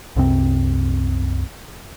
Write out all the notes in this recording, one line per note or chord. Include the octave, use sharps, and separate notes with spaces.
C2 F#2 C3 C4